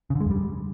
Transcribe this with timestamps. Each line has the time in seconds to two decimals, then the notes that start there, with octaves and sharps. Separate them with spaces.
0.10 C#3
0.15 D3
0.21 G#3
0.26 F2
0.31 G3